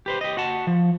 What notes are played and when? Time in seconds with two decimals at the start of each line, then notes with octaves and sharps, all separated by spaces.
0.06 G4 B4 C5
0.21 G4 D#5
0.37 F#4 F#5 A5
0.67 F3